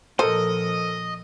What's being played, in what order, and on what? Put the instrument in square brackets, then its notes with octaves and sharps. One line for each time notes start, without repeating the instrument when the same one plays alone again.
[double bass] A#2 F3 [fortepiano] A4 A#4 [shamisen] C5 [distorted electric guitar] D#5